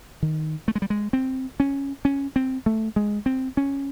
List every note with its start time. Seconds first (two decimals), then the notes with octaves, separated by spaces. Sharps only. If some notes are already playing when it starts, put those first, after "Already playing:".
0.23 D#3
0.68 A3
0.75 G#3
0.82 G3
0.90 G#3
1.13 C4
1.60 C#4
2.05 C#4
2.36 C4
2.66 A3
2.96 G#3
3.26 C4
3.57 C#4